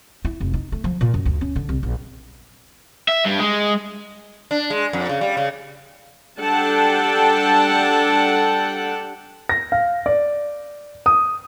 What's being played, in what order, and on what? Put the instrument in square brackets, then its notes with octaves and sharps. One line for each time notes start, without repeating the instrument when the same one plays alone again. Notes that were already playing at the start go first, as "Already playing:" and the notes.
[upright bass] E4
F1
D#4
A3
F3
A#2
F#2
D2
C#4
D3
C2
A#1
[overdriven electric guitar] E5
G2
G#3
[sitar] D4
G#3
F2
C#3
G3
C#3
[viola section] G3 D4 A4 F#5 G5 A5
[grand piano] A#6
F5
D5
D#6